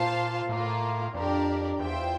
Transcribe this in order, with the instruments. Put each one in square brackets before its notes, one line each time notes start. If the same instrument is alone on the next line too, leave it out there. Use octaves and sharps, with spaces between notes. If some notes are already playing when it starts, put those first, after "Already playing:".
Already playing: [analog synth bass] A#2 [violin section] F4 C5 F5 A5
[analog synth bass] A2 [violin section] A#3 F4 A#4
[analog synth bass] F2 [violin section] D4 G4 A#4 D5
[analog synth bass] E2 [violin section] F4 C5 E5 G5